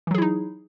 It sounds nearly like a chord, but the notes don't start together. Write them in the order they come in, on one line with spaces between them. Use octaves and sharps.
E3 F#3 G#4 E4 D#4